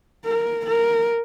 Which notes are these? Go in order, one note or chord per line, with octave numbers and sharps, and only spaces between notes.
A#4
A#4